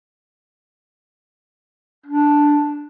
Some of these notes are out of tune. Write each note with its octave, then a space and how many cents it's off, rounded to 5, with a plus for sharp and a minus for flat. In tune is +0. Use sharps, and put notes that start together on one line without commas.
D4 +0